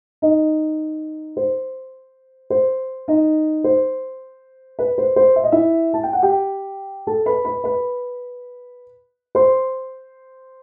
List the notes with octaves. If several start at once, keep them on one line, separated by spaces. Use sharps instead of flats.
D#4 D#5
C5
C5
D#4 D#5
C5
B4
C5
C5
E5
D#5
E4 E5
A5
G5
F#5
G4 G5
A4 A5
B4 B5
B4 B5
B4 B5
C5 C6